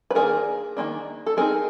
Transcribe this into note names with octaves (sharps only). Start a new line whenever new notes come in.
B4
D#3 F#3 A#3 D4 G#4 A#4
D#3 G3 A#3 D4
A4
G3 C4 D#4 G#4 A#4